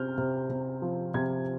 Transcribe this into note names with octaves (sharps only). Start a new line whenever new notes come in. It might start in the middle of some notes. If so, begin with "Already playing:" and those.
Already playing: C3 C4 F6 G6
C3
C3
F3
C3 G#6